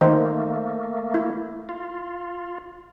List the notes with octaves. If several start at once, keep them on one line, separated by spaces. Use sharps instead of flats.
D#3 A3 A#3 D#4 C5
E4
F4